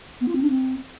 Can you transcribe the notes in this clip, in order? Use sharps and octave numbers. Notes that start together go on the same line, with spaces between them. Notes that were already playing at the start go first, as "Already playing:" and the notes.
B3
F4
C4
D4
C4